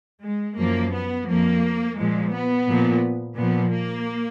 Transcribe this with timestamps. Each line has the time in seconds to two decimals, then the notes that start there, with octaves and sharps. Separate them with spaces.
0.23 G#3
0.58 F#2 F3 A#3
0.94 B3
1.28 F2 F3 A#3
1.98 A#2 F3 G#3
2.33 B3
2.68 A#2 F3
3.37 A#2 F3 B3
3.73 A#3